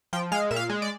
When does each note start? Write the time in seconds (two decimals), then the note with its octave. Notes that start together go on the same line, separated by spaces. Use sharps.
0.13 F3 G5
0.32 G#3 F5
0.51 A#2 E5
0.56 F5
0.70 G#3
0.82 D5